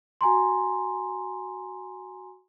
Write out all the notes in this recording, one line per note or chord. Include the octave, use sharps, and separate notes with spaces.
F#4 G#5 A#5 C6